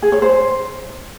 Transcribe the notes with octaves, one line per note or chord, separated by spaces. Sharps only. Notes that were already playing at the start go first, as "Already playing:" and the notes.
G#4
C#5
C5